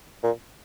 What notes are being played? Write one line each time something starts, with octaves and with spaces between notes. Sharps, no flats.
A#2